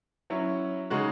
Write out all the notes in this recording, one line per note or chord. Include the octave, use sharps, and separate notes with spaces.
F#3 C#4 E4
C#3 G#3 D#4 F#4